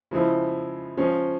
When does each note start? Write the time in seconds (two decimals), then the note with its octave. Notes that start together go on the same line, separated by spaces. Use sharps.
0.11 C#3 F3 G#3 E4
0.97 F3 G#3 C#4